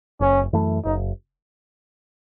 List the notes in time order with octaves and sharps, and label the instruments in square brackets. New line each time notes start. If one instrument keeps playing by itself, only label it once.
[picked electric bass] F#1 [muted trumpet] C#4
[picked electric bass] F#2 E3 A3
[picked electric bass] F#1 [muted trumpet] D#4